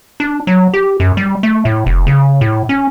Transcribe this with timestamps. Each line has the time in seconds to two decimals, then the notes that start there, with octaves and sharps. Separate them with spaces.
0.20 D4
0.47 F#3
0.74 G4
1.00 F#2
1.17 G3
1.43 A3
1.65 A2
1.86 F1
2.07 C#3
2.41 A2
2.69 C#4